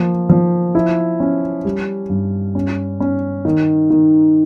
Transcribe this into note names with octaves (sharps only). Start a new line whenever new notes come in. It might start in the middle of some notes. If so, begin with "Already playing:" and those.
Already playing: F3 A#3
F3
E4
C#4
G3
G2
C#4
C#4
D#3
D#3